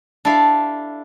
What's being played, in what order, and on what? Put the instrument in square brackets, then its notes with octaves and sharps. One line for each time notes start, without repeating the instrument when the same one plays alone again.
[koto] D4 E4 G4 A4 D5 F5